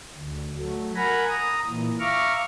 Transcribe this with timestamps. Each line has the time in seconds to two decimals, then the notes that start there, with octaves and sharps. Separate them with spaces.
0.16 D2
0.58 F#3 A3
0.96 A#4 F#5 G#5 A#5 B5
1.29 A#5 D#6
1.66 A#2 E3
2.00 E5 F5 A#5 C#6 D6 F6